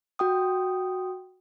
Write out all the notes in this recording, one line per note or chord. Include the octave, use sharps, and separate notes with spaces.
F#4 G5 D#6